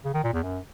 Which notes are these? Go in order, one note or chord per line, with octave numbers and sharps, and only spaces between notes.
C#3
D#3
A#2
E2
F#2